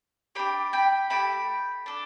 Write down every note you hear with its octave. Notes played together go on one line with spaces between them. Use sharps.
D4 G4 G5 B5
G5 B5
A3 E4 G4 G5 B5
D4 A4